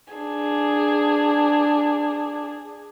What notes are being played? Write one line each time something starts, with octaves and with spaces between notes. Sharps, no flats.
D4 G#4